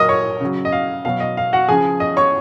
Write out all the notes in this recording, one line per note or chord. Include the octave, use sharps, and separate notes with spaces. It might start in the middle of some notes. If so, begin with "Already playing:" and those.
Already playing: A#2 F#3 A#4 D#5 D#6
C#5 C#6
C#3 F#3
D#5
F5
B2 F#3 F5
D#5
F5
F#4 F#5
C#3 F3 G#4 G#5
D#5 D#6
C#5 C#6